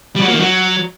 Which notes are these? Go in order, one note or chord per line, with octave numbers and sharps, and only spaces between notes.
G3
F#3
A#3
D#3
F#3